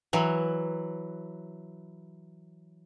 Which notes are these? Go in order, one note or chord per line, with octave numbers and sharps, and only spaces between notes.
E3 F#3